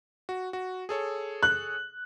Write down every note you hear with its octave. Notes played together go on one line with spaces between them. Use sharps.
F#4
F#4
G#4 A4 C#5
F#6